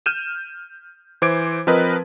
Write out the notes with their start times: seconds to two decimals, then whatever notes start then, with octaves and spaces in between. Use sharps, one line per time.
0.06 F6 G6 D#7 E7
1.22 E3 C5 D6 G#6 D7
1.67 F3 C4 A#4 B4 D#5